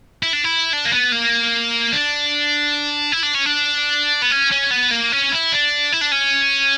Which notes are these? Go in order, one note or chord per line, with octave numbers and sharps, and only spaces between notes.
E4
D4
E4
D4
A#3
B3
A#3
D4
E4
D4
C#4
D4
B3
C#4
C#4
B3
A#3
C#4
E4
D4
E4
D4
C#4